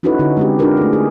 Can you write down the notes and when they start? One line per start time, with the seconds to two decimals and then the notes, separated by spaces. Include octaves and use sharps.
0.03 C#4 D#4 E4 F#4 A4 B4
0.19 D3 D#4 F#4
0.37 G#3 C4 G4
0.59 D4 D#4 F4 G4 A#4 B4
0.77 A3 G#4
0.93 G#4